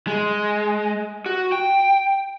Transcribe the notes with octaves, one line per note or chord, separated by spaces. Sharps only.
G#3
F#4
G5